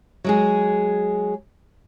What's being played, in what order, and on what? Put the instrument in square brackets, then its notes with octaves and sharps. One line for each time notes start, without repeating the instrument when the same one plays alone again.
[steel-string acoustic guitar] F#3 G#3 G#4